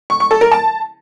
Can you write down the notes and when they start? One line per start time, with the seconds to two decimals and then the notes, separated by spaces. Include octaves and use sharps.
0.10 C#6
0.20 C#6
0.31 A4
0.41 A#4
0.52 A5